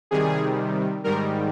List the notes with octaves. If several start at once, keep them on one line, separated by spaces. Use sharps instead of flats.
C3 D#3 G3 G#4
G#2 D#3 G3 A#4